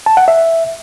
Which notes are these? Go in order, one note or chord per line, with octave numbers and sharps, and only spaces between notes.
A5
F#5
E5